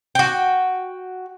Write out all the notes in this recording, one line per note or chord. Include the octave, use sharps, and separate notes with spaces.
F#4 G5